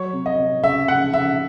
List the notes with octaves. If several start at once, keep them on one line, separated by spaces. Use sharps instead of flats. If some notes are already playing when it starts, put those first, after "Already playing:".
Already playing: F#3 C#5
C3
D#5
C3
C#3 E5
C#3 F#5
C#3 E5